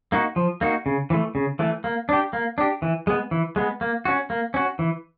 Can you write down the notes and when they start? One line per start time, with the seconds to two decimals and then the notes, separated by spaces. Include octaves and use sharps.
0.12 A#3 D#4 F#4
0.36 F3
0.61 A#3 D#4 F#4
0.86 C#3
1.10 E3 A3
1.35 C#3
1.59 E3 A3
1.84 A#3
2.09 D4 G4
2.33 A#3
2.58 D4 G4
2.82 E3
3.07 G#3 B3
3.31 E3
3.56 G#3 B3
3.81 A#3
4.05 C#4 F#4
4.30 A#3
4.54 C#4 F#4
4.79 E3